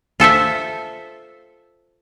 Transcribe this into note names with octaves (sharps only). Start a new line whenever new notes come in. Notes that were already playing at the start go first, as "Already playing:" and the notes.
F4 A4 C5 E5